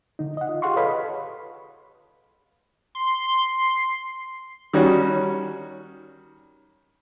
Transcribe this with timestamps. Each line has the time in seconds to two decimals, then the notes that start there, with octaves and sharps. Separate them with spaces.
0.19 D3 D#4
0.37 D#5 F#5
0.49 F4
0.62 G4 G#4 F5 F#5 C6 C#6
0.76 A4 B4 C#5 D#5 F5 B5
2.95 C6
4.73 D#3 G3 C#4 F#4